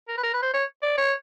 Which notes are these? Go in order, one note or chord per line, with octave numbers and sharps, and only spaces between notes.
A#4
B4
A#4
B4
C5
C#5
D5
C#5